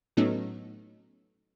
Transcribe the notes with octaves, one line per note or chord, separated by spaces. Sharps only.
A2 F#3 A3 B3 C#4 D#4